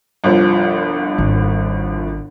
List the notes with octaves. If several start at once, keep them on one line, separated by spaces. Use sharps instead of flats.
G1 C2 F3
G#1